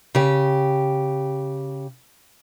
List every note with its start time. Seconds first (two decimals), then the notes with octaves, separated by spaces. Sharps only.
0.15 C#3 G4